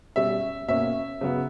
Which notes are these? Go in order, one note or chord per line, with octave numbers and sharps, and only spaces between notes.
B2 G3 C#4 E5
B2 A#3 C#4 E5
C#3 F#3 B3